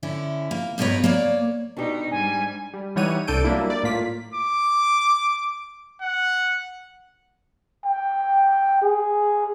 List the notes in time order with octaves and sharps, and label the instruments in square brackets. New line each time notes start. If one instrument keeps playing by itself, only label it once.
[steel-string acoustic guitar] D3 C#4 E4
A#3
G2 B2 A#4 B4 C#5
A#3 C#5 D5
[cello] B2 D#4 [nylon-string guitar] D4 G4
[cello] G#2 G3 [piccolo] G#5
[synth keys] G3
E3 G3 D#4 C#5 F#5 D#7
C2 D4 A4 G6 D7 D#7
F#3 G3 A#3 D4 E4
D5
A2 A#3 F4 B6
[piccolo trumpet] D6
F#5
[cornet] G5
G#4